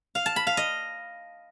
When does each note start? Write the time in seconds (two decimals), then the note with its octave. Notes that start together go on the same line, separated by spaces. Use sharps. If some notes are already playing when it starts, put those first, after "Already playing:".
0.15 F5
0.26 A5
0.36 B5
0.47 F5
0.57 D#5